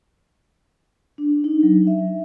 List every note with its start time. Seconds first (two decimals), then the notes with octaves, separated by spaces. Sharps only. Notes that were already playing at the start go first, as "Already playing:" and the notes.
1.18 D4
1.44 D#4
1.63 F#3
1.87 E5